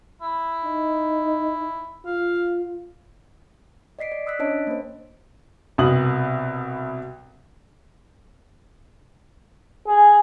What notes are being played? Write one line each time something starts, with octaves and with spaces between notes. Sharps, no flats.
E4
D#4
F4 F5
D5 D#5 B6 C7 D7
D5
D#6 E6 F#6 B6
C#4 D4 C#5 D#5 A5 D7
C#5
A#3 C5
C2 B2 D#6 F#7
G#4